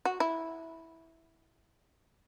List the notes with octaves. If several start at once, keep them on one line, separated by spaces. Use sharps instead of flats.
F#4
E4